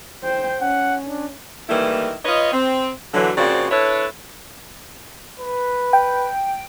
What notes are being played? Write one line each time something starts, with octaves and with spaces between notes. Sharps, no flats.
C5 G5
C#4 F#5
D4
D#3 E3 G3 A3 A#3 E4
F4 B4 C#5 D#5
C4
D3 E3 F#3
C#3 F3 A#3 C4 F#4 D5
D4 E4 A4 B4 C#5
B4
G5